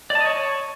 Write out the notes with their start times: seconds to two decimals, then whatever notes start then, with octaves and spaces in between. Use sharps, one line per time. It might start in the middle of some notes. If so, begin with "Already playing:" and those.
0.10 D5
0.15 A5
0.20 D#5
0.25 C#5